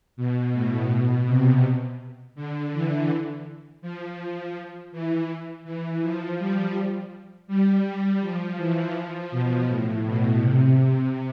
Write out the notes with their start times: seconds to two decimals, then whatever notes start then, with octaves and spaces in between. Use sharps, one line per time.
0.17 B2
0.53 A2
0.90 B2
1.26 C3
2.35 D3
2.73 E3
3.82 F3
4.92 E3
5.65 E3
6.02 F3
6.39 G3
7.47 G3
8.21 F3
8.57 E3
8.94 F3
9.31 B2
9.68 A2
10.04 B2
10.40 C3